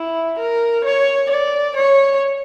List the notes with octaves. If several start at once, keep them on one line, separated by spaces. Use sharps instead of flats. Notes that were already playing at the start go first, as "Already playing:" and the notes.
Already playing: E4
A#4
C#5
D5
C#5